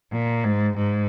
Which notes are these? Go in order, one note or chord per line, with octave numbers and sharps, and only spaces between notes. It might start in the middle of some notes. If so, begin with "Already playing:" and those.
A#2
G#2
G#2